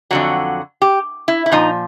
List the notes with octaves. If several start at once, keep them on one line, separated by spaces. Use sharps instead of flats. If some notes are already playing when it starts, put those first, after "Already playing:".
F2 D3 F#3 F#4
G4
E4
E4
A#2 F3 D#4